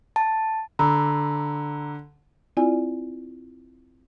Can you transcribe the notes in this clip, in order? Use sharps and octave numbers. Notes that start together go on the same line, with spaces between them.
A5
D3 A#5 B5 E6
C4 E4 F4 D5 G#5